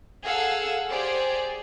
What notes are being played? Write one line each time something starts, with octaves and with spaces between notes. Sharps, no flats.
G#4 A4 F5 F#5 E6
G4 G#4 C5 D5